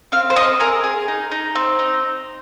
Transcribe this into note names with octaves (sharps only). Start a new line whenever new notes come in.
C4 F5
C5
C4 D#5
G#4 A#4
G#4
D#4
D#4
C4
D#4